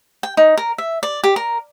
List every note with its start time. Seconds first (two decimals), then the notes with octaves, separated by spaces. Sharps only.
0.23 G5
0.37 D#4
0.57 A#4
0.78 E5
1.03 D5
1.24 G4
1.36 A#4